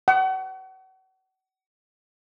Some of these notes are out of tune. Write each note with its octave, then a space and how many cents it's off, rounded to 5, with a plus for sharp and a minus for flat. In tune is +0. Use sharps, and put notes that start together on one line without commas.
F#5 +35